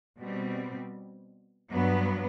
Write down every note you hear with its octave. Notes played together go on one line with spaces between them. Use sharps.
B2 G3 C4
G2 F#3 B3